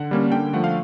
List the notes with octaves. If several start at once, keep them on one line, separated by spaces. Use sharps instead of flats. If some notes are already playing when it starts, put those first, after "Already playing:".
Already playing: D3 F#5
G3 A#3 C#4
D3 G5
F3 A3 F#5
F5